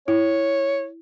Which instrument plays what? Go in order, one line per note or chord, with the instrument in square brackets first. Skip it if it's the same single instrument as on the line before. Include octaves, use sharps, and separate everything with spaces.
[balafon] E4 [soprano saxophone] C#5